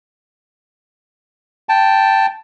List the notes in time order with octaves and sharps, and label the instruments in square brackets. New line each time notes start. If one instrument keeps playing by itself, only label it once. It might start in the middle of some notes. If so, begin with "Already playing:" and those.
[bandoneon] G5 A5